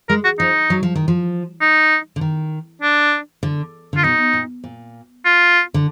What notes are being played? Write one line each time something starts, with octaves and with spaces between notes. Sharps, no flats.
G#3 A#4
F#4
F3 D#4
F#3
F3
D#3
F3
D#4
D3
D#3
D4
D3
D3 F4
B2 D#4
A#2
A#2
F4
D3